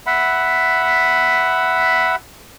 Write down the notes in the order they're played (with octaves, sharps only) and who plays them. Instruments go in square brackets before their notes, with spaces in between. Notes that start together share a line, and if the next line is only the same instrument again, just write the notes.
[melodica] E5 F#5 B5